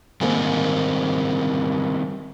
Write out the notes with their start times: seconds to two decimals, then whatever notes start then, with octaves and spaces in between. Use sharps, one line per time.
0.21 G#2 D#3 G3 A#3 C4